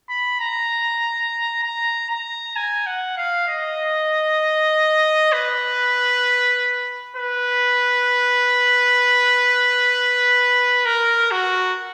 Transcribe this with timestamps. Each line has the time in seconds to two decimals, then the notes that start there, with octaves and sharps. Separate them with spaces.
0.10 B5
0.41 A#5
1.63 A#5
2.10 A#5
2.56 G#5
2.86 F#5
3.17 F5
3.48 D#5
5.33 B4
7.17 B4
10.85 A#4
11.31 F#4